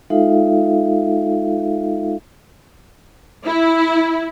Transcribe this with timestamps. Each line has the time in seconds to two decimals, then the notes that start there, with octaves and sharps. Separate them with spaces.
0.10 G#3 D#4 F4 A4 E5 F5
3.46 E4